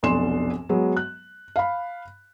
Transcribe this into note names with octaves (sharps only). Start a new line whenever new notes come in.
F1 B1 B2 D4 C6 E7
F#3 G#3 B3
F#6
F5 B5